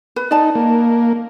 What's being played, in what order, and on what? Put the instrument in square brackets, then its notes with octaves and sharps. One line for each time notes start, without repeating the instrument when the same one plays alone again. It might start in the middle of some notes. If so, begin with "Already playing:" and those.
[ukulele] B4
[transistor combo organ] D#4 [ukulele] D5 A5
[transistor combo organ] A#3